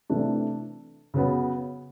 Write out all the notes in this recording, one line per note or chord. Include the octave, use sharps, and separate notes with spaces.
C3 E3 A3 D4
C#3 F#3 B3